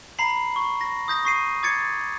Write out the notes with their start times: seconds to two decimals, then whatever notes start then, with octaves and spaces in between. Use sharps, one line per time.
0.19 A#5 B5 C7 F#7
0.56 C#6
0.81 A#6
1.08 D#6 G6 A#6
1.25 C#6 C7 D#7
1.63 D6 G#6 A6 C#7